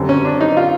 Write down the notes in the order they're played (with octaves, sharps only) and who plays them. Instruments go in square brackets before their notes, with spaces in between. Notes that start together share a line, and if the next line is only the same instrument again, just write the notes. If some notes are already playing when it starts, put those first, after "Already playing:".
Already playing: [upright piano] F#2 D3 G3 C4
[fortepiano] C#4
D4
D#4
F4